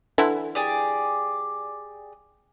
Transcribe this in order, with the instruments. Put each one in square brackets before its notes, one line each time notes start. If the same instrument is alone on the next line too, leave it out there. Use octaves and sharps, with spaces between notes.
[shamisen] D3 E3 E4
[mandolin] G4 G#4 D5